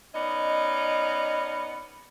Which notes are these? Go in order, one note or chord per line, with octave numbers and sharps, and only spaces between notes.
B3 C#4 D#4 D5 D#5